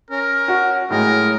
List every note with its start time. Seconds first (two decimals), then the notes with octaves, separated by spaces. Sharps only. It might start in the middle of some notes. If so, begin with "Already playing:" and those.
0.11 C#4 A#4
0.48 F#4
0.90 A2 F#3 G#3 A#4 D#5